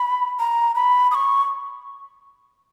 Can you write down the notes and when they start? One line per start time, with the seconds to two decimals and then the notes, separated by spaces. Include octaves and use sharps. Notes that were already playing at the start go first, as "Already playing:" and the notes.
Already playing: B5
0.39 A#5
0.75 B5
1.11 D#6
1.15 C#6